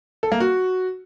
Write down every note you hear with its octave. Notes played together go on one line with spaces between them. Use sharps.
A4
A#3
F#4